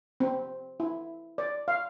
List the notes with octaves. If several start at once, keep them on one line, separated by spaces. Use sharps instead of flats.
C4
E4
D5
F5